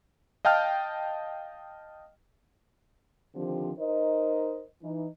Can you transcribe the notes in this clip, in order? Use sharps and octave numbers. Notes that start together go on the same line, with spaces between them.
D#5 F5 G5 A5 F6
D3 D#3 F3 C4 D4 G4
D#4 A#4 C5 D#5
E3 D#4